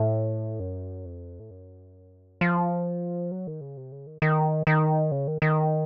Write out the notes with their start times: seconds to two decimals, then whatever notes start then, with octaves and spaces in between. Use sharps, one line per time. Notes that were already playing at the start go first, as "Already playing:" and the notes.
Already playing: A2
0.60 F#2
1.05 F2
1.40 A2
1.51 F#2
2.41 F3
3.31 F#3
3.47 D#3
3.61 C#3
3.77 C3
3.92 C#3
4.07 D#3
4.22 D#3
4.67 D#3
5.11 C#3
5.27 D#3
5.42 D#3